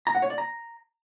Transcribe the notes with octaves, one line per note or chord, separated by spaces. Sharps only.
A#5
F#5
C#5
D5
A#5